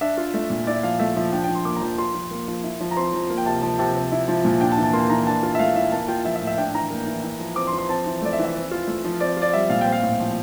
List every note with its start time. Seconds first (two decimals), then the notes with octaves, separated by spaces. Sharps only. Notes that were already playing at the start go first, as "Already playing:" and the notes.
0.01 D4 E5
0.17 F4
0.34 A3
0.50 A#2
0.67 E4 D5
0.83 F3 F5
0.99 A3 E5
1.16 F3 E5
1.32 D4 G5
1.44 F3 G5
1.55 C6
1.65 A#3 D6
1.76 A#5
1.81 F3
1.98 F4 C6
2.15 F3
2.31 A#3
2.48 F3
2.63 E4
2.80 F3
2.91 A#5
2.97 C4 C6
3.13 F3
3.30 A#3
3.38 G5
3.46 C3 A5
3.62 F3 A5
3.79 C3 A5
3.96 C4
4.12 E4
4.28 F3
4.45 A#2
4.61 D4 G5
4.72 A5
4.78 E3
4.83 A5
4.93 A#3 C6
5.10 E3 A#5
5.27 D4 A5
5.43 F4
5.55 E5
5.59 A3 F5
5.76 E3 E5
5.92 A#3 A5
6.08 F4 G5
6.25 F3 E5
6.36 E5
6.41 A2
6.47 E5
6.58 D4 G5
6.74 E3 A#5
6.90 A#3
7.07 E3
7.23 E4
7.40 F3
7.56 C4 D6
7.67 C6
7.73 F3
7.78 C6
7.89 C4 A5
8.06 E3
8.22 A3 D5
8.33 E5
8.39 E3
8.44 E5
8.55 C4
8.71 F4
8.87 A3
9.05 F3
9.20 C4 D5
9.37 F4 D5
9.53 G3 E5
9.70 A#2 F5
9.81 C4 G5
9.93 F5
10.03 A2
10.19 F3